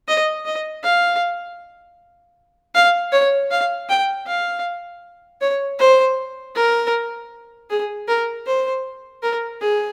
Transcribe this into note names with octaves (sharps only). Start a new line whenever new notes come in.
D#5
D#5
F5
F5
C#5
F5
G5
F5
C#5
C5
A#4
G#4
A#4
C5
A#4
G#4